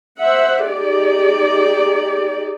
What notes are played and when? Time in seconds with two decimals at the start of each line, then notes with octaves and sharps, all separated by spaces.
0.20 C5 E5 F#5
0.67 D#4 G4 G#4 D5